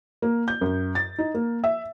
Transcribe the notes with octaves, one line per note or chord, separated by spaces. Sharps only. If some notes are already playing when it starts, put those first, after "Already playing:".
A#3
G6
F#2
A6
D#4
A#3
E5